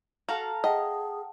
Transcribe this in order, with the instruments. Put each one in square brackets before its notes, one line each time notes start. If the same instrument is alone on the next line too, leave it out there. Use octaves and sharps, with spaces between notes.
[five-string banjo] F#4 [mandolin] A4 F5 A#5
[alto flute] G#4 [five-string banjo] D#5 [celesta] F#5 G5 A5